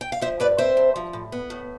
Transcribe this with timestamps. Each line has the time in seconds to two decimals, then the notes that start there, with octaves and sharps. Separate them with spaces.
0.01 G5
0.12 F5
0.21 F3 C5 E5
0.40 G2 B4 D5
0.58 C4 C5 E5
0.77 G2
0.96 F3
1.13 A2
1.32 B3
1.50 A2